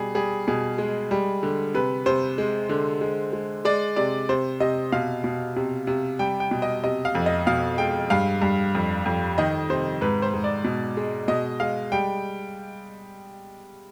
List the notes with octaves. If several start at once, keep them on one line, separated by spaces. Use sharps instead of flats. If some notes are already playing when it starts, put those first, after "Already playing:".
Already playing: B2 G3 G#4
G3 G#4
B2 G#4
G#3
G3
D3
C3 B4
C3 C5
G#3
D3
G#3
G#3
G#3 D5
C3 D5
C3 C5
C3 D#5
B2 F5
B2
C3
C3
G3 G5
G5
B2
D#5
C3 D#5
F5
F2
D#5
B2 F5
G#3 G5
G2 F5
G2
F2
F2
D#3 D#5
C3 C5
G#2 B4
C5
G#2
D5
B2
G#3
B2 D#5
G#3 F5
G3 G5